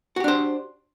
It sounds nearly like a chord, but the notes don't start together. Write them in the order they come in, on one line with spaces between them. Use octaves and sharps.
F#4 G4 D4 C5